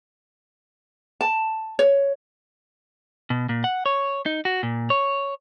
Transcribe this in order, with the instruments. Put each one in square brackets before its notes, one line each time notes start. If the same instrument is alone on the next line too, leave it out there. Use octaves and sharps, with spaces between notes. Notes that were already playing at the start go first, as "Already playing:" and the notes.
[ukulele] A5
C#5
[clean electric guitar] B2
A#2
F#5
C#5
D#4
F#4
A#2
C#5